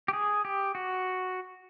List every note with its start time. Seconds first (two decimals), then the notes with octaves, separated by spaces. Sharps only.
0.08 G4
0.13 G#4
0.45 G4
0.75 F#4